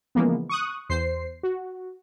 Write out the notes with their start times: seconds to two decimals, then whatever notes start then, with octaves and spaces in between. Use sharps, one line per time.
0.15 C#3 E3 F3 G#3 A#3 B3
0.49 C#6 D#6 F#6
0.90 E2 C5 C7
1.43 F#4